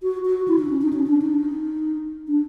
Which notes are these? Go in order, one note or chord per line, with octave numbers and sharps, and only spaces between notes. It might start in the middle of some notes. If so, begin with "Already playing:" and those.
F#4
F#4
E4
D#4
D4
C#4
D#4
C#4
D4
D#4
D4